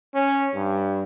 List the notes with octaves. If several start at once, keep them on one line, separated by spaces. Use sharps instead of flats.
C#4
G2